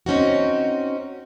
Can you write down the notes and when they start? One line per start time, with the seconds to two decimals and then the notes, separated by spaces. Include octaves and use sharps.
0.06 C4 C#4 D#4 F#4